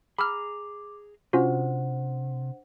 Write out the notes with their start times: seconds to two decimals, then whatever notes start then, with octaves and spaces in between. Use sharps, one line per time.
0.19 G#4 G5 A#5 B5 D6 E6 F6
1.33 C3 C#4 D4 F4 F#4 C5 F#5